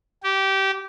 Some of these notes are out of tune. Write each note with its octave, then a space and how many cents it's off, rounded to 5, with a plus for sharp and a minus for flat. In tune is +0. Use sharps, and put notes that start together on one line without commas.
G4 -20